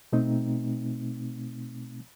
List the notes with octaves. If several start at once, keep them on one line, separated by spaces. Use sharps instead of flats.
B2 A3 C4 D#4